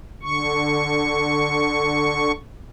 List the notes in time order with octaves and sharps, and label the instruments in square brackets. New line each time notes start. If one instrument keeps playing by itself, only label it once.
[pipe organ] D3 C#6